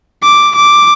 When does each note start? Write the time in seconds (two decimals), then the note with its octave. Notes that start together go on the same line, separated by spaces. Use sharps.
0.23 D6
0.56 D6